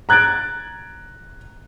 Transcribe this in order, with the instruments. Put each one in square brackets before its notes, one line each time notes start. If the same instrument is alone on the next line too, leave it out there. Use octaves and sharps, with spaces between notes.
[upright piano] A#5 F#6 G#6 A6 D7